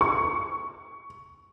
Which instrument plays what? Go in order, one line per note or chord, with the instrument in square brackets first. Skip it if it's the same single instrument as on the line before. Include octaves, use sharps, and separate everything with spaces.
[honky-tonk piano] C#6